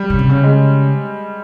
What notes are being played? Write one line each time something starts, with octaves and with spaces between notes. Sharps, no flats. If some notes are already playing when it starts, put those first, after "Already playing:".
Already playing: G3
C#3
C3
C#3
G#3